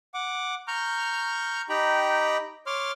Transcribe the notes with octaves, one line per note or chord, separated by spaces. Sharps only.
F#5 D6
A#5 C#6 F6 G6
D#4 G4 G5 A#5 B5
C#5 C6 D6 F6